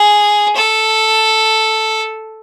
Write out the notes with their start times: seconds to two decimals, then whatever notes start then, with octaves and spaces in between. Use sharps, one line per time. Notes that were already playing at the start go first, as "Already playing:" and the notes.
Already playing: G#4
0.55 A4